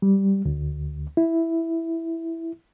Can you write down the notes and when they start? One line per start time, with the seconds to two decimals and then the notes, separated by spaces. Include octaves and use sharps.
0.02 G3
0.45 D2
1.17 E4